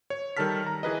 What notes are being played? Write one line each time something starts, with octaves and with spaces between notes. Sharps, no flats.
C#5
D#3 G3 A4 A5 F6 B6
A#5
E3 G#4 B4 D#5